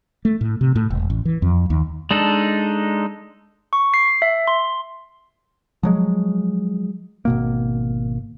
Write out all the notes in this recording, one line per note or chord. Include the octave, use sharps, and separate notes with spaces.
A3
A2
C3
A2
E1
A1
E3
F2
D#2
G#3 D4 D#4 A4
C#6
C7
E5
C6
F3 F#3 G#3
G#1 B2 A#3